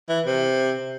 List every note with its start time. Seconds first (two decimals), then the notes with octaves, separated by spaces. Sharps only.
0.09 E3
0.26 C3